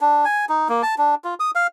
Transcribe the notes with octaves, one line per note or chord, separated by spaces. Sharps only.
D4
G#5
D#4
A#3
A5
D4
F4
D#6
F5